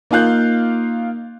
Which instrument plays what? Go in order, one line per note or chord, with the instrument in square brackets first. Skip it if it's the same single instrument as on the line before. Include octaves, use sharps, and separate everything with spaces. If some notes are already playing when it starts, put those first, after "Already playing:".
[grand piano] A#3 D#4 F4 F5 F#6 G6